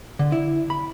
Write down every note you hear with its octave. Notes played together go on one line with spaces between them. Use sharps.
D3
E4
B5